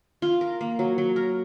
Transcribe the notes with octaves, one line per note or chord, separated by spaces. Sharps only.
F4
A#4
A#3
F#3
F#3
A#4